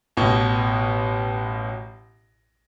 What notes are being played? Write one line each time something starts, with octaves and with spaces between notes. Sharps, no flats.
A1 B2